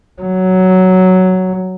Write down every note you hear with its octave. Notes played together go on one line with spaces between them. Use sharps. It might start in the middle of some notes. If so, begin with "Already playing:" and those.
F#3